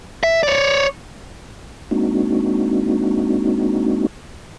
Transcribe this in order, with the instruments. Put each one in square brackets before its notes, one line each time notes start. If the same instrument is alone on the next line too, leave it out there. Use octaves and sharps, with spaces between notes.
[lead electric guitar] E5
C#5 D5
[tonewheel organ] G#3 A#3 C4 D4 D#4 F#4